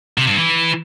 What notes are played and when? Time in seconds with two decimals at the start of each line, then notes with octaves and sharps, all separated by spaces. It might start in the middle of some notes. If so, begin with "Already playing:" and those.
0.18 C3
0.28 G2
0.38 E3